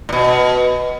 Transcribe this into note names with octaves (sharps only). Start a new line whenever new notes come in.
A#2
B2